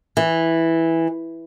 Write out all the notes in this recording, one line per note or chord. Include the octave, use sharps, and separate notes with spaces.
E3